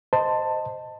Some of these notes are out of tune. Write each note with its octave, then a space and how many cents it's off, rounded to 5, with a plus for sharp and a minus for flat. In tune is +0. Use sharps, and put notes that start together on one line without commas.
C5 -5 D#5 +0 A5 +15